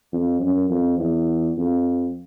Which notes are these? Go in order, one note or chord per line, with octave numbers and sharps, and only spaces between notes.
F2
F#2
F2
E2
F2